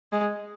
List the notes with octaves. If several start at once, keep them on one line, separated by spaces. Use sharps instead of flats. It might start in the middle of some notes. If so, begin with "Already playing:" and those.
G#3